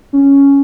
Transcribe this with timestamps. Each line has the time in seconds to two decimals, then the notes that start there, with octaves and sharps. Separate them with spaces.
0.13 C#4